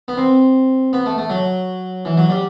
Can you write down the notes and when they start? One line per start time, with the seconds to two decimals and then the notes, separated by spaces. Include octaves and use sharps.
0.08 B3
0.17 C4
0.93 B3
1.06 A3
1.18 A3
1.30 F#3
2.05 E3
2.18 F#3
2.30 G3